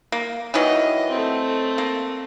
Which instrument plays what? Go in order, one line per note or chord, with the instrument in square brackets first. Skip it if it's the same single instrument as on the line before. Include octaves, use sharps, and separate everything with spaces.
[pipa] A#3
[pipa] D#3 E3 F#3 [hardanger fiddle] D#5
[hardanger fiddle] A3 C4
[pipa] A#3